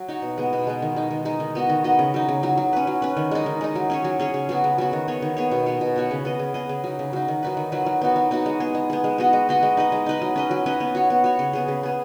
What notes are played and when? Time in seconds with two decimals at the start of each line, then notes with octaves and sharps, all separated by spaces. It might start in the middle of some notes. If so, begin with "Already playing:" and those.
Already playing: F#3
0.08 D#4 F#4 C#5
0.22 B2
0.38 G#3 B3
0.53 B2
0.67 G#3 B3
0.82 D#3
0.96 G#3 D#4
1.11 D#3
1.25 G#3 D#4
1.40 D#3
1.55 B3 F#4 D#5
1.69 D#3
1.84 B3 F#4 D#5
1.99 C#3
2.14 F#3 D#4
2.29 C#3
2.43 F#3 D#4
2.57 F#3
2.73 C#4 B4
2.87 F#3
3.02 C#4 B4
3.17 D#3
3.31 G#3 D#4
3.46 D#3
3.61 G#3 D#4
3.75 F#3
3.90 C#4 G#4 C#5
4.04 F#3
4.19 C#4 G#4 C#5
4.34 C#3
4.49 F#3 B3 F#4
4.64 C#3
4.78 F#3 B3 F#4
4.93 D#3
5.08 B3 G#4 C#5
5.22 D#3
5.37 B3 G#4 C#5
5.51 B2
5.66 B3 F#4 C#5
5.81 B2
5.96 B3 F#4 C#5
6.11 C#3
6.25 B3 G#4 D#5
6.39 C#3
6.54 B3 G#4 D#5
6.69 C#3
6.84 F#3 D#4
6.99 C#3
7.13 F#3 D#4
7.28 D#3
7.43 F#3 D#4 B4
7.57 D#3
7.72 F#3 D#4 B4
7.86 F#3
8.01 B3 D#4 F#4
8.16 F#3
8.31 B3 D#4 F#4
8.46 G#3
8.60 B3 G#4
8.75 G#3
8.90 B3 G#4
9.04 G#3
9.18 B3 F#4 D#5
9.33 G#3
9.49 B3 F#4 D#5
9.63 G#3
9.77 D#4 B4 D#5
9.92 G#3
10.06 D#4 B4 D#5
10.22 F#3
10.36 C#4 B4 D#5
10.51 F#3
10.66 C#4 B4 D#5
10.80 B3
10.95 F#4 C#5
11.10 B3
11.24 F#4 C#5
11.39 C#3
11.53 B3 G#4
11.68 C#3
11.83 B3 G#4